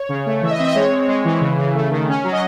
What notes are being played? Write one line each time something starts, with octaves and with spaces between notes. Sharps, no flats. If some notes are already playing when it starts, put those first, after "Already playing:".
Already playing: C#5
C#3
A3
E3 E5
D#5
C4 E5
D#5
G#3 C#5
C4
G#3
E3
C#3
C#3
A3
D#3
C#4
F#3
D#5